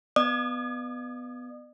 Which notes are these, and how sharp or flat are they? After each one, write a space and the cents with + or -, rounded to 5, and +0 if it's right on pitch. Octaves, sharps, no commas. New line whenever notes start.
B3 +10 D5 +45 D#6 -30